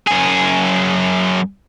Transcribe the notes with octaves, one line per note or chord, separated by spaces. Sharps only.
F#2 G#4